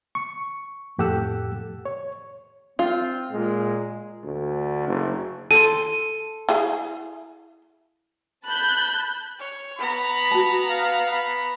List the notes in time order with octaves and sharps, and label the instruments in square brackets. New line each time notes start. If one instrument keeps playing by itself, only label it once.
[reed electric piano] C#6
F2 A2 G4 A4 F#5 E6
C#5
[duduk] C4 [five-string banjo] F4
[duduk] A#2 [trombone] G#3
[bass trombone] D2
F#1
[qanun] A4 C6 [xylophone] D#7
[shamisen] E4 G#4 F5
[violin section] A5 B5 F#6 G6
[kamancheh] C#5
[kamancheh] B3 A#5 [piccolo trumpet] B5
[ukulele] F#4 A5
[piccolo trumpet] F5
B5